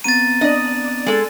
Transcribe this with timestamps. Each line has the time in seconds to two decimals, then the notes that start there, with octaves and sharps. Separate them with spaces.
0.04 B3 C4 A#5 A6 D#7
0.41 D4 D5 D#5
1.06 G#3 A4